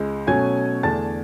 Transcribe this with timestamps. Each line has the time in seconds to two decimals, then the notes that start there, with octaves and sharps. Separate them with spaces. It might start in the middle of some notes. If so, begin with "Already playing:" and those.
Already playing: C#2 G#3
0.27 B2 F#3 A3 C#4 G#5 G#6
0.83 E2 D3 A3 D4 A5 A6